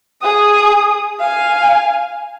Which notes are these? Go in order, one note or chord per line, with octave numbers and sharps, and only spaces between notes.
G#4 D#6
F5 G#5